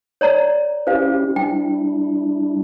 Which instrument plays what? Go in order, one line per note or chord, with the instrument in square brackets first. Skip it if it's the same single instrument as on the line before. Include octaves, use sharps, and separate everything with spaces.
[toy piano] C#5 D5 A#5
[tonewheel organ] C#4 E4 G4 [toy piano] C5 F5
[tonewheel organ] G3 D4 E4 [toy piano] G5